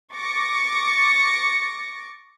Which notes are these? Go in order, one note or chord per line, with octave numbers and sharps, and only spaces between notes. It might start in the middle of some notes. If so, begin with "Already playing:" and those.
C#6 D6 A6 A#6 C#7